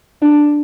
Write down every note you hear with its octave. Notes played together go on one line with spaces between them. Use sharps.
D4